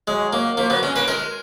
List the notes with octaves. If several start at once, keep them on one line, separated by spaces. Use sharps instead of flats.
F#3 G#3
F#3 A#3
F3 A#3
F#3 B3
G#3 C#4
A#3 B4
G#3 A#4